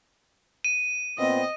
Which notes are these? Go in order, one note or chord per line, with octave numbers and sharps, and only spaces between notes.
D#7
A#2 B3 C4 D#5